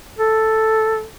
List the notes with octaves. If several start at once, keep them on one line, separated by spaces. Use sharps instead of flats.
A4